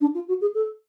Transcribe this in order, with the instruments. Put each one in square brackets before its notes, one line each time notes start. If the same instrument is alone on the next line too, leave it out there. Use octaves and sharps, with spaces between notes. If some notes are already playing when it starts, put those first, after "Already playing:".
[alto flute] D4
F4
F#4
G#4
A4